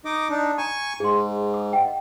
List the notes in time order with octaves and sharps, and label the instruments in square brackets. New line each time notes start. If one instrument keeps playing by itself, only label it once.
[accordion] D#4 D#5 D6
D4 D#4
[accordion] G#5 C#6 [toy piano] A#5
[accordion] G#2 [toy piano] G#4 C6
[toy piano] D6
D#5 F#5 G5